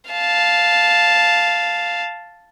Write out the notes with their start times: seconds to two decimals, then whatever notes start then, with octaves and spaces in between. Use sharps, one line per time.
0.11 F5 A5